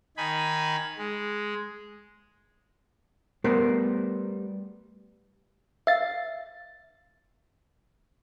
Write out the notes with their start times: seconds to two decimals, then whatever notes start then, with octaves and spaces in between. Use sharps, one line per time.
0.17 D#3 D#4 G#5 B5
0.98 G#3
3.44 G3 A3 B3 A#4 C5
5.87 E5 F5 A6